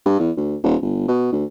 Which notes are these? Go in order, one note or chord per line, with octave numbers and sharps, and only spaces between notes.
G2
E2
D2
D#1
G1
B2
D2